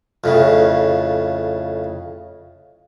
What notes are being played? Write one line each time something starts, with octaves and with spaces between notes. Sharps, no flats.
F2 A2 C#3